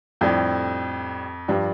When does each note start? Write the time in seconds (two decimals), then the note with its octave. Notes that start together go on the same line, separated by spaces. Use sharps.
0.21 F2 A2 G3 D4 G4
1.48 G2 F3 D4 G4